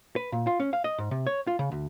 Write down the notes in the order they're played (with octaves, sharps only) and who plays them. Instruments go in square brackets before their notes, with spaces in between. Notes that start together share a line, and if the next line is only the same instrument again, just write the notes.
[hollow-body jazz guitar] B4
A#2
F4
C#4
F5
D#5
G#2
C3
C#5
F4
C#3
D2